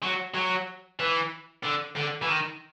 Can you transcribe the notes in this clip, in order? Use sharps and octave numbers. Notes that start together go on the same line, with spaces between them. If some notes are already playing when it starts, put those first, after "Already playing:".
F#3
F#3
E3
D3
D3
E3
D#3